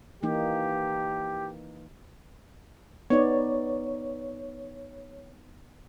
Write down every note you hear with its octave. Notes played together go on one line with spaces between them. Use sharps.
E3 A#3 D#4 G4
B3 D#4 C#5 D5